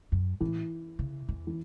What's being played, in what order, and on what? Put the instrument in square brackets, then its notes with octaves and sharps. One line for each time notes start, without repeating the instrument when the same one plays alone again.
[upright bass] F#2
[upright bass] A2 [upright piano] E3
[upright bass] C#3
E2
[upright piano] E3